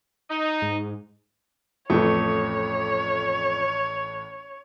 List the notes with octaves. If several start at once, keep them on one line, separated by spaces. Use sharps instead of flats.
D#4
G#2
A1 F2 A3 C#5